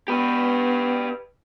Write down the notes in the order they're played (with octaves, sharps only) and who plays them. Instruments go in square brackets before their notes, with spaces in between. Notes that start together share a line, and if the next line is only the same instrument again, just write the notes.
[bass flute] B3 [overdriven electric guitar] G4 B4